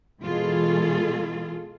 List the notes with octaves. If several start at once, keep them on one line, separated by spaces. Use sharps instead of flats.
B2 E3 G#3 F4 G#4 A4